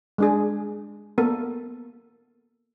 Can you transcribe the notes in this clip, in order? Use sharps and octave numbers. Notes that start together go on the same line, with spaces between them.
G#3 D4 G#4
A#3 B3 A4 A#4